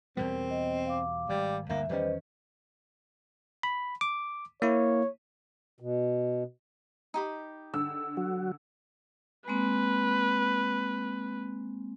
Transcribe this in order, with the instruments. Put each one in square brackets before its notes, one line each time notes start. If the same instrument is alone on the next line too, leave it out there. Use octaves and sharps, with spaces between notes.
[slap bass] E2 B2 G3 [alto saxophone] C4 [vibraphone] A#4
[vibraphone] D#5
F5 D6
[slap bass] G#1 [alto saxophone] G3
[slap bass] D2 G2 D3 [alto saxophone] A#3 [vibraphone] E5
[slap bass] E2 D#3 C#4 [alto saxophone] G3 [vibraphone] B4 C5 D#5
[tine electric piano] B5
D6
[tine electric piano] A#3 E4 [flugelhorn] C#5
[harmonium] B2
[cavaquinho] D#4 G4 B5
[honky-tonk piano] D3 E6
[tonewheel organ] F#3 F#4
[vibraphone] G#3 A#3 C4 [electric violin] B4